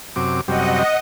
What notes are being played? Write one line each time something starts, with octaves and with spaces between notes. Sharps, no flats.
F#2 C3 D6
F#2 C3 G3 D#5 F#5